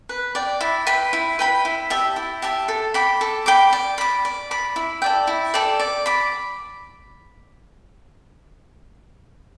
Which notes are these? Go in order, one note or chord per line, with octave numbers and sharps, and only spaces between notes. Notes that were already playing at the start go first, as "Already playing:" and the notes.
B4
D5 G5
E4
B4 G5 B5
E4
B4 G5 B5
E4
G4 E5 A5
E4
G4 E5 A5
A4
G5 B5 D6
A4
G5 B5 D6
D5
B5 D6
D5
B5 D6
E4
A4 D5 G5
E4
A4 D5 G5
D5
B5 D6